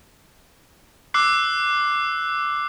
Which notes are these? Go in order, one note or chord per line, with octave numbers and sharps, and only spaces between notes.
D6 E6 F#6 C7